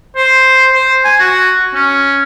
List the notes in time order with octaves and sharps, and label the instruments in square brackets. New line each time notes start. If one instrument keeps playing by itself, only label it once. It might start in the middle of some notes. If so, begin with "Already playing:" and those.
[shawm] C5
C5
G#5
F#4
C#4